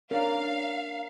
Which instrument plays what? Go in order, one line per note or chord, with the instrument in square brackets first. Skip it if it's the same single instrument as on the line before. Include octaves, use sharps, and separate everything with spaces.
[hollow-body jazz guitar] C#4 D4 [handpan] A#4 [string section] F5